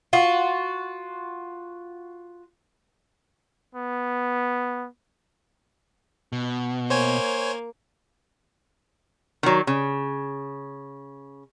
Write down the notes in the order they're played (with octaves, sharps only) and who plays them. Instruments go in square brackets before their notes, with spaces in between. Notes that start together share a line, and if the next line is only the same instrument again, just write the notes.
[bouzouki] F4 F#4
[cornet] B3
[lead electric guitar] B2
[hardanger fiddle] A#3 [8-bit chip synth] C5 C#5 G#5
[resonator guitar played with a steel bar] D#3 F#3
C#3